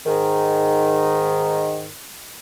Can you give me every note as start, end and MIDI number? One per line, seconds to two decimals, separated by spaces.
0.06 1.87 44
0.06 1.87 51